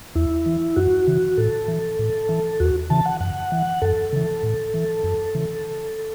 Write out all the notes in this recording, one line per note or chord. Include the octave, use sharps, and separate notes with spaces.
E2 E4
E3
F#2 F#4
C#3 E3
A2 A4
E3
A2
E3
E2 F#4
C#3 E3 A5
F#5
F#2 F#5
E3
F#2 A4
C#3 E3
A2
E3
F#2
C#3 E3